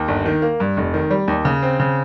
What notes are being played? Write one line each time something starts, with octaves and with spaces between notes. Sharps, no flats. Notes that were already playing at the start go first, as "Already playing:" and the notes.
Already playing: D#2
G1
D#3
A#3
G2
F1
D#3
G3
D#2
C#3
C4
C#3